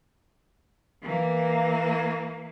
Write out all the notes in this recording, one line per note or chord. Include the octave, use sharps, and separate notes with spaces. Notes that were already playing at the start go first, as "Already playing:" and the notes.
E3 A#3